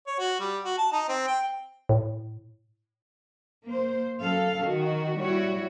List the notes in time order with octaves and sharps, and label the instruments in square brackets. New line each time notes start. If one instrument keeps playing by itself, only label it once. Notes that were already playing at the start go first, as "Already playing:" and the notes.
[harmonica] C#5
F#4
G3
F#4
A5
D#4
C4
G5
[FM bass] A2
[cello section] A#3 C5
F#2 A4 F5
D#3 F#4
G3 E4 F#4 C#5